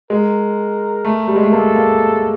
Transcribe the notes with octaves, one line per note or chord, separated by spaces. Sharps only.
G#3 A#4
A3
G3
G#3
A3
A#3 A4
A#3